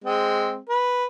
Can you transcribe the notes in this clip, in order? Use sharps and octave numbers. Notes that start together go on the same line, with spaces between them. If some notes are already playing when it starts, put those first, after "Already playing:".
G#3 C4
B4